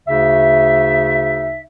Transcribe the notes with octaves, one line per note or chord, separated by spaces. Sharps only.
D2 C#3 D#4 E5